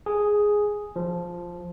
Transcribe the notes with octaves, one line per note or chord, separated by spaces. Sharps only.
G#4
F3